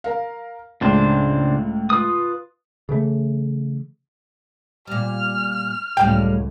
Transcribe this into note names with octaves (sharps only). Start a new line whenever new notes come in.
A#4 F5
C#2 A2 C#3 D4 C5
F4 B4 D#6
C#3 E3 A3
A#2 G3 F6
C#2 F#2 A2 G3 F5 G5